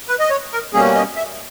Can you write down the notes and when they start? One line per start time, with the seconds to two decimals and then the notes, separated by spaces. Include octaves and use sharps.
0.08 B4
0.20 D#5
0.30 C#5
0.52 A#4
0.73 B2 G3 A#3 C#4 G#4
0.95 D#5
1.16 E5